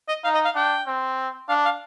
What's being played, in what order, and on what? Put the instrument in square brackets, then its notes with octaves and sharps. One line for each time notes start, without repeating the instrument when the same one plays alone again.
[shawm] D#5
[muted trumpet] D#4 [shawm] F5
[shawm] D#5
F5
[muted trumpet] D4 [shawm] G5
[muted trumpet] C4
[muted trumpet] D4 [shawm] F5
[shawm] F5